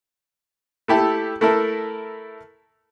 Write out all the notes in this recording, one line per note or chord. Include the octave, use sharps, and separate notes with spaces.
A3 E4 G4 A4
A3 E4 A4 A#4